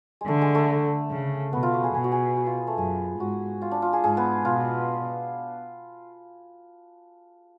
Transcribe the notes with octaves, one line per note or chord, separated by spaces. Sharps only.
G#3
D3 A3
G#3
A3
C#3
B2 B3
F4
F#4
G#4
B2 G#4
F#4
G#4
F#4
F4
B3
A3
F#2 G#4
G#2 F#4
F4
D4
F4
G#4
G#2 G#4
B3
B2 F4